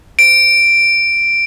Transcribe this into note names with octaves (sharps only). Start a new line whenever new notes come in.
D7